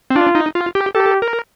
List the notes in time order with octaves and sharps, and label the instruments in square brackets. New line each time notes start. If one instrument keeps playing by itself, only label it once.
[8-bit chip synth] C4
[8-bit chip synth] D4 [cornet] F4
[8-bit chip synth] D#4
F4
G4
[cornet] G4 [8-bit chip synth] A4
[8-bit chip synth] A#4